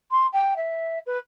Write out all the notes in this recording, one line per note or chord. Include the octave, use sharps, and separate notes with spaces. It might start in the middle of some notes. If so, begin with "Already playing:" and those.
C6
G5
E5
B4